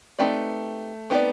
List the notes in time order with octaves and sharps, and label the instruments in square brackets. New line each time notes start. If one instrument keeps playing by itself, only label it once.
[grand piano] A3 [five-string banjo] C4 D#4 G4 B4 D5
[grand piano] B3 [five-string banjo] C4 D#4 G4 B4 D5